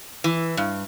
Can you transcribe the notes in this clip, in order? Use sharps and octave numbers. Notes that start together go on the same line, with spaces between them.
E3
G2